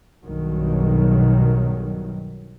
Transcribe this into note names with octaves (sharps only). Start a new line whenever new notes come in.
B1 G2 B2 D#3 F#3